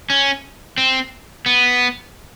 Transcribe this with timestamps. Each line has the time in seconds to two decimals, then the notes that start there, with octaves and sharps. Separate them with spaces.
0.10 C#4
0.78 C4
1.46 B3